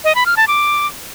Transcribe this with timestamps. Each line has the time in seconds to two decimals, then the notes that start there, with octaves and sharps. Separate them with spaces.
0.04 D#5
0.15 B5
0.26 F6
0.37 A5
0.48 D6